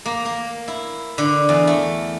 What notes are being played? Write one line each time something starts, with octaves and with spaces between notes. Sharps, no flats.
A#3
A#3
E4
D3
E2
A3